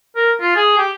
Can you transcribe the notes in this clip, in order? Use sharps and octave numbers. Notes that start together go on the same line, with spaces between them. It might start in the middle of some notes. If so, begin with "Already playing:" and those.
A#4
F4
G#4
G4